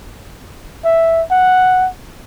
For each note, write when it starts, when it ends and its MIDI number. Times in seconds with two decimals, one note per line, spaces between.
0.85 1.22 76
1.31 1.89 78